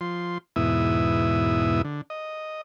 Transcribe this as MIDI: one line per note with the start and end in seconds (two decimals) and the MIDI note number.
0.01 0.38 53
0.01 0.38 84
0.56 1.82 40
0.56 1.82 44
0.56 1.82 47
0.56 1.82 64
0.56 1.82 76
0.56 1.82 87
1.85 2.01 50
2.10 2.61 75